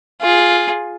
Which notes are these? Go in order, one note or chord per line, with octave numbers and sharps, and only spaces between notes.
F4 G#4